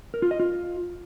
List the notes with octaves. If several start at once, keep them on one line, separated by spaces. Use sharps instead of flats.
A#4
F4
D#5
F4